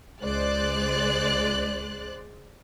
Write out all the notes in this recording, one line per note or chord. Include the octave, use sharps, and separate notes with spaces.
C#2 G#3 C5 D5 F#6 A6